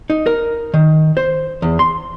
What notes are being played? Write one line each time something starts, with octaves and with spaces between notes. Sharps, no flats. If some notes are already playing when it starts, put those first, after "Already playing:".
D#4
A#4
D#3
C5
E2
C6